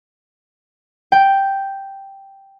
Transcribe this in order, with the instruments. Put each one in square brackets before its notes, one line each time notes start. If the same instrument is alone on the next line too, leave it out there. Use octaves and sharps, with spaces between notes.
[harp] G5